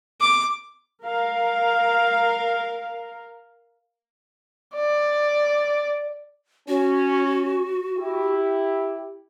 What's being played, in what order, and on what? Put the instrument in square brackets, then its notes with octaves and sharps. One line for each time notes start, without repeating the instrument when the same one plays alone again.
[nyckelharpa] D6
[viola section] A#4 F5
[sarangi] D5
[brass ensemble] C#4 [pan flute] F#4
[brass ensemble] E4 G4